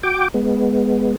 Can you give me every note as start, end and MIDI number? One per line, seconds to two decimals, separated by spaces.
0.03 0.28 66
0.03 0.28 79
0.03 0.28 86
0.34 1.16 56
0.34 1.16 59